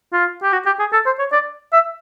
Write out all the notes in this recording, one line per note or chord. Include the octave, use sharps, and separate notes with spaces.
F4
G4
F#4
G4
G#4
A4
C5
C#5
D5
E5